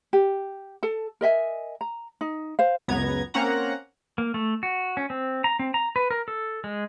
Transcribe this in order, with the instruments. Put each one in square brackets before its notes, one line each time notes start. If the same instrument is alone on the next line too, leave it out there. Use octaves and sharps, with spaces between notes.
[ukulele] G4
A4 A5
A#4 D#5 E5 G#5
A#5
D#4
C5 F5
[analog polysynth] C#2 F#2 B3 A#5 G#6
A#3 C4 C#4 F#5 A#5
[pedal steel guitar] A#3
A3
F#4
C#4
C4
A#5
C4
A#5
B4
A#4
A4
G#3